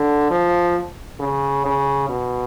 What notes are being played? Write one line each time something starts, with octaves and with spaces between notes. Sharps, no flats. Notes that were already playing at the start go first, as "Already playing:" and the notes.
Already playing: D3
F3
C#3
C#3
B2